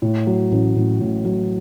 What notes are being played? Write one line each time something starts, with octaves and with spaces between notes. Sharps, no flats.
A2
F#3
A1
A1
A2
F#3